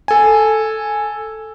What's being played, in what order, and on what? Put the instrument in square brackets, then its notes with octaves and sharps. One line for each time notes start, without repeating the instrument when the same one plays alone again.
[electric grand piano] A4 G#5